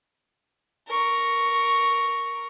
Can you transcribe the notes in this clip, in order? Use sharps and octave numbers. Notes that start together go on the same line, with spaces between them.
A#4 C#6